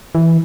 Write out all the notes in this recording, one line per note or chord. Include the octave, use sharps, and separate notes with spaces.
E3